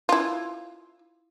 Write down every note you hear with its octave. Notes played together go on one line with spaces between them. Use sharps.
E4 F4